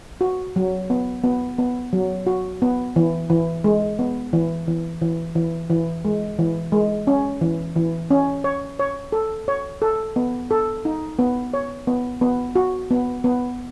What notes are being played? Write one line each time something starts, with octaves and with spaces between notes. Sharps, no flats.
F#4
F#3
B3
B3
B3
F#3
F#4
B3
E3
E3
G#3
B3
E3
E3
E3
E3
E3
G#3
E3
G#3
C#4
E3
E3
C#4
C#5
C#5
A4
C#5
A4
B3
A4
D#4
B3
C#5
B3
B3
F#4
B3
B3